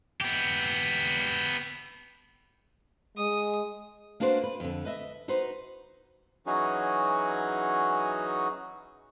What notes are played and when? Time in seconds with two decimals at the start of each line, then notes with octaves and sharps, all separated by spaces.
0.21 B3 G4
3.17 G#3 D#6
4.20 A#3 D4 F#4 B4 C5
4.44 B4
4.60 F2 D3
4.85 B4 D#5 E5
5.28 D#4 F#4 B4 C5
6.46 E3 F#3 C#4 D#4 F#4 G#4